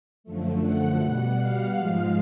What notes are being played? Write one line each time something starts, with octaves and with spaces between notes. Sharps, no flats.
F#2 D3 F3 A3
F#5
B2 G3
F5
G#2 F3 G#3